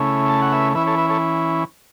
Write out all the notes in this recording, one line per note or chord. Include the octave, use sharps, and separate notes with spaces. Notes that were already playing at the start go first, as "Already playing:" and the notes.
Already playing: C#3 A3 C#4 E4
A5
F#5
B4 E5
E3 C#4 E4 B4 E5
A4 C#5
B4 E5
A4 C#5